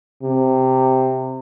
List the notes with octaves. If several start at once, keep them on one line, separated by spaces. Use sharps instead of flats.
C3